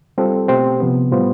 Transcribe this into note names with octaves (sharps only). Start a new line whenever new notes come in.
G3 C4 F4 A4 C5
B2 A3 C4 G4 C5
C3 F3 B3
A2 G3 B3 F4 C5